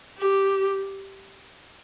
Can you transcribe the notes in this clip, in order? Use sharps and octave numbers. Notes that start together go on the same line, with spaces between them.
G4